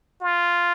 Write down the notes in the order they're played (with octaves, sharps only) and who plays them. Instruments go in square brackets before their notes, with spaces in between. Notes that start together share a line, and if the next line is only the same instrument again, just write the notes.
[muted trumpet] F4